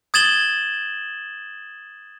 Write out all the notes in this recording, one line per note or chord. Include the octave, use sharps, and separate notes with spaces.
D#6 G#6 A6 E7 F#7 G7